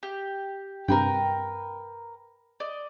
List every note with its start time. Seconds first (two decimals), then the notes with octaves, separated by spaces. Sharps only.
0.03 G4
0.88 G2 C3 A#4 B4 G5
2.60 D5 D#5